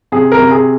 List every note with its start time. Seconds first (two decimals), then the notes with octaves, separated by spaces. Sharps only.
0.12 C3 G#4
0.32 A#4
0.39 C3
0.51 G#4